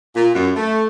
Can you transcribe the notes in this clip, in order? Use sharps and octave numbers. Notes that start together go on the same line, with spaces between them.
A#2
F#2
A3